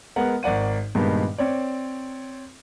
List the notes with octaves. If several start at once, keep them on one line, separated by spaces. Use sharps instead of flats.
G#3 B3 A#4 F#5
G#1 A#4 D5 F#5 D#7
G2 A#2 D#3 G#3 B3
C4 C#5 D5